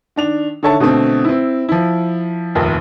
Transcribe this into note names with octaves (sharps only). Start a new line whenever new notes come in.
D#3 D4 F7
D3 D#3 A4 C#5 E5 A5
B2 D3 A3 C4
C4 E4
F3 E4
F1 A#1 D#2